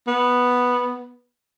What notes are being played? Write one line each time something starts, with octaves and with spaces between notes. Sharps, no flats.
B3